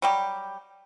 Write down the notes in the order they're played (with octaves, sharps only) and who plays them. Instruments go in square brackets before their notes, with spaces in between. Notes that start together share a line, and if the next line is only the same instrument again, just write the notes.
[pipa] F#3 G3 G4